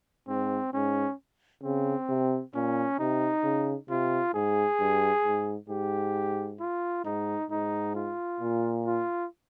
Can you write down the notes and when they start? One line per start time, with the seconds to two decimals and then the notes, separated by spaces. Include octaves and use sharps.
0.28 G#2 C4
0.73 G#2 C#4
1.63 C#3 C4
2.09 C3
2.54 A#2 C#4
2.99 C3 D#4
3.44 C#3
3.89 C3 F4
4.34 G#2 G#4
4.80 G2
5.25 G#2
5.70 G#2 G4
6.60 F4
7.05 G#2 D#4
7.50 G#2 D#4
7.95 F4
8.40 A#2
8.86 F4